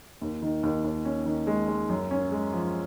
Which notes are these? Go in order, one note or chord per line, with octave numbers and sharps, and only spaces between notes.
D#2
D#3
D#2
D#2
C#4
D#3
G#3
G#3
F#2
C#4
G#3
F3